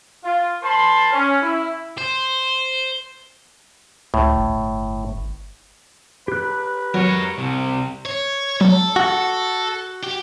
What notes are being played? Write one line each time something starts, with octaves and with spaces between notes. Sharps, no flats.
F4
A#4 C5 A5 B5 C6
C#4
E4
C5
C#2 A2
G1
G4 B4 F#6
F#3 A#4 C#5
C2 C3
C#5
F#3 A4
F#4
G4